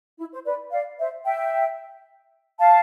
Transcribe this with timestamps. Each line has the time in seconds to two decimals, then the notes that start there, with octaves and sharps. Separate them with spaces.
0.19 E4
0.32 C5
0.45 B4 D5
0.72 D5 F5
0.99 C5 E5
1.25 E5 G5
2.59 F5 A5